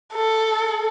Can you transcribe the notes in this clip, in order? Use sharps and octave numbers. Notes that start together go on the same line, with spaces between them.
A4